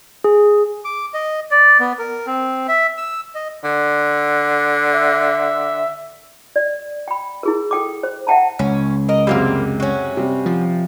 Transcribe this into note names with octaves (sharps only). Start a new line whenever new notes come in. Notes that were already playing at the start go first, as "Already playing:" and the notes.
G#4
D6
D#5
D5
B3
A#4
C4
E5
E6
D#5
D3
E5
D5
G5 B5
E4 G#4 A#4
A4 G5 D6
C5
E5 F#5 G5 A5 A#5
C#2 C#4
A#4 D#5
F#2 C3 G3 G#3 A#3 C4
C#4 F#4
C3 G3
F3